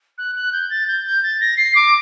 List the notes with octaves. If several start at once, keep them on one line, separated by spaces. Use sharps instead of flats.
F#6
F#6
G6
A6
G6
G6
A6
A#6
C7
D6